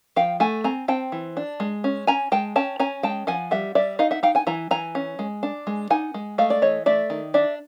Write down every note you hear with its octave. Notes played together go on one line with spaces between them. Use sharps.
F3 F5 G5
A3 F#5 G#5
C4 G#5 A#5
C4 G5 A5
E3
D4
G#3
C#4
C#4 G#5 A#5
G#3 G5 A5
C#4 G5 A5
C#4 G#5 A#5
G#3 G5 A5
F3 F#5 G#5
G3 E5 F#5
G3 D5 E5
D#4 D#5 F5
E5 F#5
D#4 F5 G5
F#5 G#5
E3 G#5 A#5
E3 G#5 A#5
C#4
G#3
D4
G#3
D#4 F#5 G#5
G#3
A3 D#5 F5
D5
E3 C#5 D#5
A3 D5 E5
D#3
D4 D5 E5